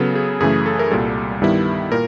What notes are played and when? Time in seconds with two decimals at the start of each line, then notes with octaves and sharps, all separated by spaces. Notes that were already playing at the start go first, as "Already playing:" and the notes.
Already playing: C#3 F#3 B3 A4
0.15 G#4
0.40 F#2 C#3 E3 A3 G#4
0.66 A4
0.79 A#4
0.91 C2 A#2 G3 A4
1.42 G2 D#3 G3 B3 E4
1.91 A#2 A#4